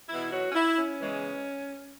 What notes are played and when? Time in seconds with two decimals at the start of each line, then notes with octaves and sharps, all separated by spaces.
0.09 E2 B2 B3 E4
0.32 F#3 F#4
0.51 C#4
0.55 E4
0.77 C#4
1.00 E2 C#3 E3 G#3